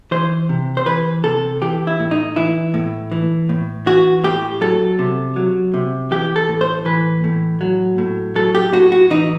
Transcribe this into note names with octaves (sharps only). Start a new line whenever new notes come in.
E3 C5
C3
C5
E3 B4
C3 A4
E3 G4
E4
A2
D#4
E3 E4
A2
E3
A2
E3 F#4
A2 G4
F#3 A4
C3
F#3
C3
E3 G4
A4
A2
C5
E3 B4
A2
F#3
A2
F#3 A4
G4
A2 F#4
F#4
E3 D#4